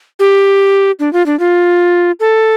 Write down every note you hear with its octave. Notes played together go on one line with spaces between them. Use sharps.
G4
D4
F4
D4
F4
A4